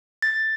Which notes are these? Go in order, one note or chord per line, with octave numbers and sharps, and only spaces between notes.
A6